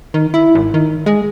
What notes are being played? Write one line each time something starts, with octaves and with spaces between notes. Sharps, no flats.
D#3
E4
G#1
D#3
G#3